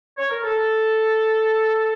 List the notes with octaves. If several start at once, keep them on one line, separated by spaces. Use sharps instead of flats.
C#5
A#4
A4